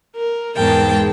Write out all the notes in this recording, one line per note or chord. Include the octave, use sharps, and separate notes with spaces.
A#4
E2 G#2 G#3 A#4 G5 A5